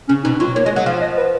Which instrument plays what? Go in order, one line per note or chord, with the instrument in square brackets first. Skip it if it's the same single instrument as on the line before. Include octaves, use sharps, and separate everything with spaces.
[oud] C#3 [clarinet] C#4
[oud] B2 [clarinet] D#4
[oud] F#3 [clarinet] F4
[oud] A#3 [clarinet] C#5
[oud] G#3 [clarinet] D#5
[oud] F#3 [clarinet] F#5
[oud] F3 [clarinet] F5
[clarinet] D#5
B4